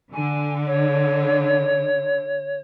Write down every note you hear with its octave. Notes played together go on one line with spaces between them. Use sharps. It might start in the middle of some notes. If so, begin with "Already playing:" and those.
D3 G#5
C#5